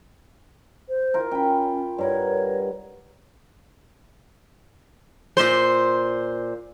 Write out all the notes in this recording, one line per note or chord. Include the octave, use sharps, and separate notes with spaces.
C5
F4 A#4
C#4 G5 B5
G2 A#4 C#5 F#5
A#2 C5